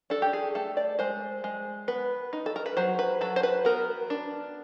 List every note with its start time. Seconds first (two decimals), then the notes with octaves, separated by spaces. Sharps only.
0.10 D4 A4
0.22 G4
0.33 G#4
0.55 A3 A4
0.77 D5
0.99 G#3 C5
1.44 G#3
1.88 B3 B4
2.33 D#4
2.46 A4
2.56 A#4
2.66 B4
2.77 F#3 C5
2.99 B4
3.21 F#3 A4
3.36 C5
3.43 B4
3.65 B3 A#4
4.10 D4